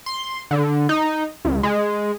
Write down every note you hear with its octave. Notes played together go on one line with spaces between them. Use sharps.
C6
D3
D#4
C#2
G#3